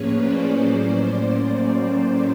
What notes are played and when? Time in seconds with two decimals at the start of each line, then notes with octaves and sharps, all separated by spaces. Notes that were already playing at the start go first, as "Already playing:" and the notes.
Already playing: A2 F3 A#3 C#4 G#4 B4 C#5
0.16 C5 D5
0.51 A2 F#3 A#3 C#4